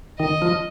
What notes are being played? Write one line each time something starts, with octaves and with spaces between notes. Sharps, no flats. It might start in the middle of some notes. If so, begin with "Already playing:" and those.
D#3 D#5
F3